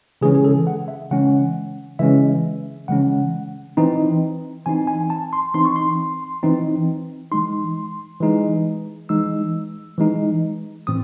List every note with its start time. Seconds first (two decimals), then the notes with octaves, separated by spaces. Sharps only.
0.21 C#3 E3 G#3 C#4 G#4
0.35 G#4
0.45 A4
0.67 F#5
0.88 E5
1.11 C#3 E3 G#3 C#4 F#5
1.99 C#3 E3 G#3 C#4 E5
2.88 C#3 E3 G#3 C#4 F#5
3.77 E3 C4 D#4
4.66 E3 C4 D#4 G#5
4.87 G#5
5.10 A5
5.33 C6
5.54 E3 C4 D#4 C6
5.65 C#6
5.76 C6
6.43 E3 C4 D#4
7.32 E3 G#3 D#4 C6
8.20 E3 G#3 D#4
9.09 E3 G#3 D#4 E6
9.98 E3 G#3 D#4
10.87 A2 E3 C4 D#6